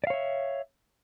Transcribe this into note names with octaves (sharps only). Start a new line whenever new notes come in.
C#5 D5 E5 F5